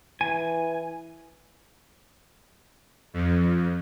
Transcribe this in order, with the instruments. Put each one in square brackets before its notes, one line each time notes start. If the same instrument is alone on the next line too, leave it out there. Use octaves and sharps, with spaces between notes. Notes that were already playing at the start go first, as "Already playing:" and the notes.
[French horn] E3 [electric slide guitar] G#5
[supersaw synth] F2